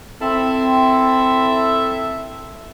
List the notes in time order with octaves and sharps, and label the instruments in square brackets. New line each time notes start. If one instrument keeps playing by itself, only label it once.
[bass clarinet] C4 [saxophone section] E4 A4 E5